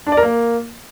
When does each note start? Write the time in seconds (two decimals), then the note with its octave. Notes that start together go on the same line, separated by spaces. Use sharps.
0.07 D4
0.12 D5
0.17 A#4
0.23 A#3